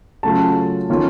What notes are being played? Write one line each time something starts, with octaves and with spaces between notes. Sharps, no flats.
C#3 F#3 A3 C#4 F4 A5
D#3 A#3 C#4 F4